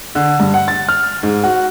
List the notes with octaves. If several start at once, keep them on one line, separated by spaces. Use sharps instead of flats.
D3
G2
F#5
A6
F6
G#2
F#4